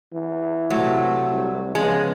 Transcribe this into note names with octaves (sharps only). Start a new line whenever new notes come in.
E3
C3 F#3 A3
C2
C#3 F3 G#3 B3